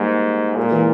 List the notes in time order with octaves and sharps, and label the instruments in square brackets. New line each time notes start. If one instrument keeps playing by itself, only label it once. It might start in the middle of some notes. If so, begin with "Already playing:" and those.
Already playing: [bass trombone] G#2 [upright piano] G3 A#3
[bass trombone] A#2 [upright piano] G#3
[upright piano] A#3
E3 G#3